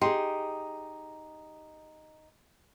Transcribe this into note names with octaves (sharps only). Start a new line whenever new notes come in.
D#4 G4 G#4 C6